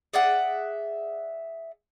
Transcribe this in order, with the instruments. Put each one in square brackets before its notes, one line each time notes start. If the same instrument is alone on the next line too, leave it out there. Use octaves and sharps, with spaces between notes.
[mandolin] G#4 D5 E5 F#5